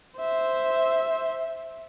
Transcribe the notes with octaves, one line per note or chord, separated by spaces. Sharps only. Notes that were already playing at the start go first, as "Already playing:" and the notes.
C5 E5